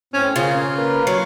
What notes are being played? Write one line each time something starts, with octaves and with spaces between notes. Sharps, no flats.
A2 C4 C#4
C#3 A#3 F4 G#4
A#3 A#4 B4
F#3 C#5